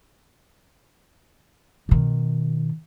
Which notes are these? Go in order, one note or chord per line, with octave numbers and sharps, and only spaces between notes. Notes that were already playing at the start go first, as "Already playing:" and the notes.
B2 D#3